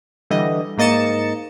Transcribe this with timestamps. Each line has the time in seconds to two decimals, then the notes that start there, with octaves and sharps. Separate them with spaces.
0.30 D3 E3 G3 D#5
0.78 G#2 A#3 D#5 A6 C#7 E7